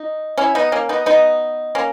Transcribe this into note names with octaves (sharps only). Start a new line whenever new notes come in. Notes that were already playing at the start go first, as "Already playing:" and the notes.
Already playing: D#4
C#4 E4
B3 D#4
A#3 C#4
B3 D#4
B3 D#4
A#3 C#4